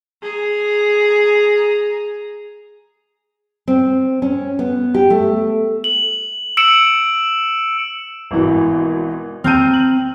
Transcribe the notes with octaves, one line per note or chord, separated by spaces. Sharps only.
G#4 A#5
C4
C#4
B3
G4
A3
F#7
E6 C#7 D7 E7 F#7
G#1 B2 E3
C4 A#5 F6 G6 D#7
F#7